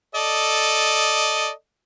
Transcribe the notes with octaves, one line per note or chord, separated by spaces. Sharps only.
A4 D5 D#5